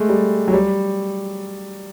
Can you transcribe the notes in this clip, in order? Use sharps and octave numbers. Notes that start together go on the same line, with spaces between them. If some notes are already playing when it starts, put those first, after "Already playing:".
Already playing: G#3 A3
G3
F#3
G3